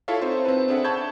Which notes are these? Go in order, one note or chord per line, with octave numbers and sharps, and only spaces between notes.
E4 F4 A4 C#5 E5 F5
C4 D#4 A4 C5
C4 B4
C4 D4 G#4 A4 E5 F#5
A5 B5 C#6 G6 G#6